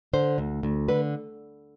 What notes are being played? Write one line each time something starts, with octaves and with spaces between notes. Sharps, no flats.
D3 C5
D2
D2
D3 B4